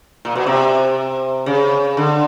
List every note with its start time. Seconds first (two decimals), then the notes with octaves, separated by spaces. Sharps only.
0.25 A#2
0.36 B2
0.46 C3
1.46 C#3
1.97 D3